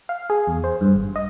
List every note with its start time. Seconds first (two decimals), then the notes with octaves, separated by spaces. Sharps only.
0.09 F5
0.30 G#4
0.47 E2
0.64 C5
0.81 G2
0.94 G#1
1.16 D#5